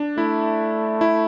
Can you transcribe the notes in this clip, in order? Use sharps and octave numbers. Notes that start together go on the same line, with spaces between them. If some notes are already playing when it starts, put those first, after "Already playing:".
Already playing: D4
A3 E4
E4